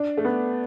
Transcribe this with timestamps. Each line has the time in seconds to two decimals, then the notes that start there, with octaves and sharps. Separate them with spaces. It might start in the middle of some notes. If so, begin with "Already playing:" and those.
Already playing: D4
0.17 A3
0.25 B3